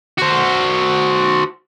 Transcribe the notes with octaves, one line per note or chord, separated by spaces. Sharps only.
F#4 C5